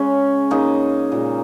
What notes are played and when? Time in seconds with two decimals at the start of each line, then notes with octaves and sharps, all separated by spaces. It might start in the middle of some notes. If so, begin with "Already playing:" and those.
Already playing: C#3 G#3 C#4
0.50 C#3 G#3 A#3 D#4
1.12 A#2 G#3